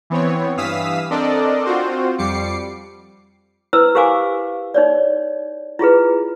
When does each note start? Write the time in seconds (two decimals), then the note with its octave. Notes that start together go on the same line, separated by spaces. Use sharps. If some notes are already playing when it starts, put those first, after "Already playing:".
0.10 E3 B3 C4 C#5
0.57 G2 E3 F5 D#6 E6 B6
1.10 C4 D4 A4 A#4 D5 D#5
1.65 C4 F4 F#4 C5
2.18 F2 G3 D6 C7 C#7
3.73 E4 B4 C5 E6
3.95 G4 A#4 C5 F5 G#5 D6
4.74 D#4 C#5 D5
5.79 E4 F4 G#4 B4